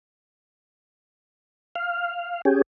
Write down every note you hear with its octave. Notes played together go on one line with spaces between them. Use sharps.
F5
C#4 G4 G#4